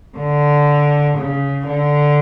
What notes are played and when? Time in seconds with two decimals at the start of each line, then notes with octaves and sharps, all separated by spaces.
0.18 D3
1.17 C#3
1.67 D3